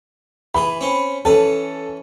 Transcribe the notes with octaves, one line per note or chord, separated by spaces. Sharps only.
E3 G#4 B5
C4 C#4
E3 C#4 A4 B4